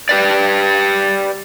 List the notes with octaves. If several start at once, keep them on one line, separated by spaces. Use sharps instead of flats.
G4 B4 D5